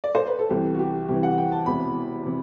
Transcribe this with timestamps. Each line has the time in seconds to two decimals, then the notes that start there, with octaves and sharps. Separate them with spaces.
0.04 D5
0.15 C5
0.27 B4
0.39 A4
0.49 C2 C3 E3 G4
0.74 F#4
0.79 G4
1.08 C2 C3 E3 G4
1.23 F#5
1.38 G5
1.52 A5
1.66 E1 E2 C3 E3 B5
2.26 C3